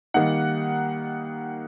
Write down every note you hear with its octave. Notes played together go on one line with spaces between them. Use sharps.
D#3 G3 A#3 D#4 F#5